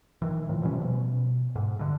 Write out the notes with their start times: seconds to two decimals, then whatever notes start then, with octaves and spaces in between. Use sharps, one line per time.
0.22 D#3 E3
0.49 A2 F3
0.62 B2 F3 G3 C#4
0.82 B2
1.56 G#2
1.79 G2 D3